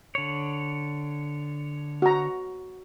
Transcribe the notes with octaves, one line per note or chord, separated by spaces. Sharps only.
D3 C#5
F#4 A#5